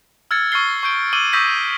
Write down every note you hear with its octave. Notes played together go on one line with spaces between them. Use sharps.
E6 F6 G#6 A6 C#7
C#6 E6 F6 A6 C7 G7
C#6 G6 D7 G7
C#6 D6 E6 D#7 F#7 G7
C#6 D#6 E6 G6 A#6 B6